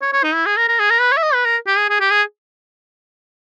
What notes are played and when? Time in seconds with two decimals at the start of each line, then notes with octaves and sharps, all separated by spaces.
0.02 C#5
0.13 C#5
0.23 D#4
0.34 E4
0.46 G#4
0.57 A#4
0.68 A#4
0.79 G#4
0.90 A#4
1.01 B4
1.12 C#5
1.17 E5
1.23 D#5
1.34 B4
1.45 A#4
1.67 G4
1.78 G#4
1.90 G#4
2.00 G4
2.11 G#4